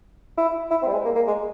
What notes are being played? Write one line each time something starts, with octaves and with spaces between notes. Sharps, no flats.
E4
E4
C4
G3
G#3
A#3
A#3
G#3